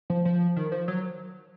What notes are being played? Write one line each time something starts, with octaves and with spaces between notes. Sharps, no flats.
F3
F3
D#3
F3
F#3